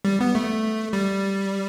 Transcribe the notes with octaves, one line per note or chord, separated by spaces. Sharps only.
G3
B3
A3
G3